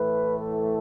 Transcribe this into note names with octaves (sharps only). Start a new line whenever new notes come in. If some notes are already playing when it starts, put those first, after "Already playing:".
Already playing: A2 E3 A3 B4
A4